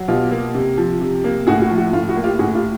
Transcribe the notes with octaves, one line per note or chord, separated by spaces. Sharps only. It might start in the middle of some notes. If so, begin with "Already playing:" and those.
Already playing: F#3
B2 F4 G4
A#3
C3
F3
C3
A#3
A2 F#4 G#4
F#4
F3
F#4
A2 F4
F#4
A#3
F4 G4
A2 F#4 G#4
F4 G4